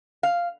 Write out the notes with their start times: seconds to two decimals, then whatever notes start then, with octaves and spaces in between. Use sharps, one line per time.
0.23 F5